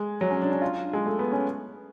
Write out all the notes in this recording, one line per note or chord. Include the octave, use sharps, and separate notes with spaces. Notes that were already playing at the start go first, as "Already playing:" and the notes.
Already playing: G#3
F#3
C#4
D4
D4
F4
G#3
A3
B3
C#4